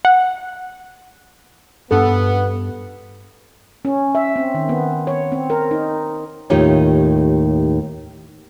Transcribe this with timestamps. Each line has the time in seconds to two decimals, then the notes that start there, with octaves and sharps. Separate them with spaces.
0.05 F#5
1.91 G2 B3 D4 A4
3.85 C#4
4.15 E5
4.36 C4
4.54 D#3
4.69 B3
5.07 C#5
5.32 C4
5.50 A#4
5.71 D#4
6.50 D#2 A2 D#4 F4 G4 C#5